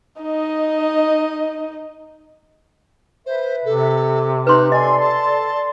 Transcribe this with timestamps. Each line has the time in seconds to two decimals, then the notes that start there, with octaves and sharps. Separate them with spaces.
0.21 D#4 D#5
3.26 B4 C5 E5
3.65 C3 A4
4.47 D#4 B4 C6 F#6 G6
4.72 A4 D5 D#5 G#5 C6
5.00 A5